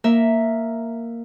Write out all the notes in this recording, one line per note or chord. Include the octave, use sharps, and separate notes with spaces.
A#3 A#4 E5